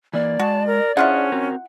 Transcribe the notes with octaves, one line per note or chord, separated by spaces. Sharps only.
E3 A#3 D5
G#3 F#4 A5
A#4
C#4 D4 E4 F4 G#4 C5 F#5
C4 F#4 A#4